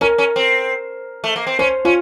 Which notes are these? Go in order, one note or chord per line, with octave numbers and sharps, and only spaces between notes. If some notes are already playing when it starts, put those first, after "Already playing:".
C#4 A#4
C#4
C4
A3
A#3
C4
C#4 C5
C#4 F4